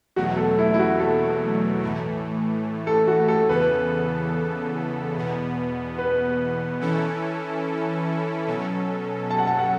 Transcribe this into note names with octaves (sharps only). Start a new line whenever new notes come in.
E2 B2 F#3 A3 F#4
A4
E4
E4
F#4
A4
A2 E3 A3
A4
F#4
A4
E2 C#3 E3 B3 A4 B4
E2 B2 B3
B4
E3 C#4 E4 A4
B2 F#3 C#4 A4
A5
F#5
A5
F#5